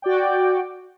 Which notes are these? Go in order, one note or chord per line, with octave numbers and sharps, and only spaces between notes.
F#4 D5 G5